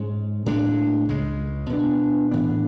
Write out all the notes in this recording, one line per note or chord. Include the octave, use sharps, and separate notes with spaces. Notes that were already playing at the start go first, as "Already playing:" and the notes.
Already playing: G#2 G#3 C#4
A2 G#3 D4
C#2 C#3 G#3
B2 G#3 B3 D4
A2 E3 B3 D4